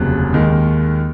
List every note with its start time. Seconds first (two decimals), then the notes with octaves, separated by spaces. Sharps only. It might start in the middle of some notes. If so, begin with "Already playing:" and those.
Already playing: F1 D#2 C#3 F#3 F#6
0.32 D#2 D#3 G#3